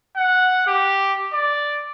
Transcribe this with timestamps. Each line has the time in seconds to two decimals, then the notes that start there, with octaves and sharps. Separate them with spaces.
0.16 F#5
0.67 G4
1.33 D5